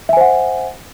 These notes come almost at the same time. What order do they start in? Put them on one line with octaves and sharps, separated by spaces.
E5 G#5 C5 F#5